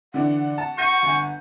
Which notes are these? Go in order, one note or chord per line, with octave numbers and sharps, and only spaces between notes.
D3 E3 D4 F#5
A5
C#6 G6 A#6 D#7
G1 G#5